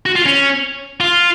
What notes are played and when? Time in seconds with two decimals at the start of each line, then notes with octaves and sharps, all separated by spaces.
0.06 F#4
0.16 F4
0.26 C#4
1.00 F4